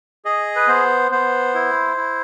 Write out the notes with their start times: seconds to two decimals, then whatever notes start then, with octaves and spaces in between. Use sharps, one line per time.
0.25 G#4 D#5
0.56 B4
0.67 B3 C5
1.11 B3 C5
1.54 E4
1.97 E4